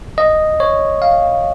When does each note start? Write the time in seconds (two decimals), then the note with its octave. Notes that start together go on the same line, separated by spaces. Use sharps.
0.18 D#5
0.60 C#5
1.02 F5